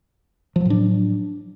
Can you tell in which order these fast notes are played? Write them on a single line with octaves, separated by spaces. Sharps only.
F3 F#3 A2 D4